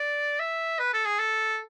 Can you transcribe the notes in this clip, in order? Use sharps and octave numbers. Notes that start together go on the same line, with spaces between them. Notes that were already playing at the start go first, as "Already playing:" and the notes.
Already playing: D5
E5
B4
A4
G#4
A4